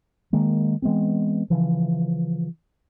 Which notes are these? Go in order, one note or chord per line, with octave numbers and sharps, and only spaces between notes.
D#3 G#3 A#3
E3 G#3 B3 C4
C#3 E3 F3